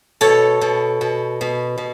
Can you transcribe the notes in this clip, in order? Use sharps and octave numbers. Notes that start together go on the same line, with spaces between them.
B2 A4 C#5
B2
B2
B2
B2